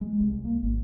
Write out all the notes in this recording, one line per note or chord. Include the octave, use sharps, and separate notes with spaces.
G#3
C2
A#3
G#1